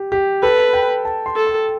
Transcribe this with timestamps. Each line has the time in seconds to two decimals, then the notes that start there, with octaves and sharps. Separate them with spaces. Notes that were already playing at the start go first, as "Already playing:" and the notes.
Already playing: G4
0.12 G4
0.42 A4 B4
0.73 G5
1.05 A5
1.26 C6
1.36 A4
1.47 C6